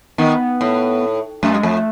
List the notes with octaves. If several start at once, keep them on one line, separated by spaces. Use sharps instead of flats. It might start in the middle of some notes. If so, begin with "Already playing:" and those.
D#3 B3
A2
F#2 A3
G#3
F2 A3